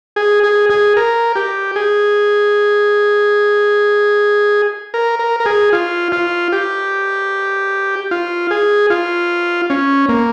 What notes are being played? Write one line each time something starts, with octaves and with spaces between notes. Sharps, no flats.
G#4
G#4
G#4
A#4
G4
G#4
A#4
A#4
A#4
G#4
F4
F4
G4
F4
G#4
F4
C#4
A#3